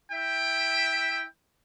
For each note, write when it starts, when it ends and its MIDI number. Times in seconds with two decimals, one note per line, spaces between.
0.12 1.24 64
0.12 1.24 76
0.12 1.24 79